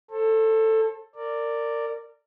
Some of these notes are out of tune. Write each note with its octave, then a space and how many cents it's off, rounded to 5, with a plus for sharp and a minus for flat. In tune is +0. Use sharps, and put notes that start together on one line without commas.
A4 +10 C5 +45
A#4 -25 D5 +0